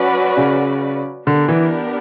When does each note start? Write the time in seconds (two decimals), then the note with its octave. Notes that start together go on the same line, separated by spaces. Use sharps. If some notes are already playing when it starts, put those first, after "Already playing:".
Already playing: F#3 C#4 F#4 B4 D5
0.37 C#3
1.26 D3 B3 D4 G4 A#4
1.48 E3